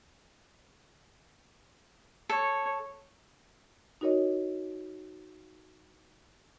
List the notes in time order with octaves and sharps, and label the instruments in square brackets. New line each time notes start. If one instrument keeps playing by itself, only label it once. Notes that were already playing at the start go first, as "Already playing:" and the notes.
[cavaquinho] A4 [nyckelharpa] C#5
[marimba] D#4 F#4 A#4 C#5 D#5